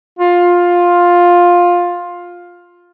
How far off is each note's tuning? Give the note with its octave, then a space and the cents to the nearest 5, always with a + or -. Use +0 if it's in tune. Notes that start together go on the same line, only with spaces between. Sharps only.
F4 +10